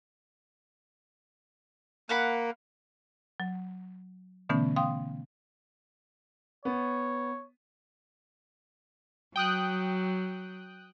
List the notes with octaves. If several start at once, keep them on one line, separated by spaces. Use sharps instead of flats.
A#3 F5 F#5 B5
F#3
B2 D3 E3 A3 B3 C#4
F5 G5 C6 D#6
B3 C#5
F#3 G5 D#6 F#6